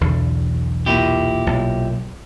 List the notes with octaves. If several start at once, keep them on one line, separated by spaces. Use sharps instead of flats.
B1 E2 D3
A#2 E4 G4
B1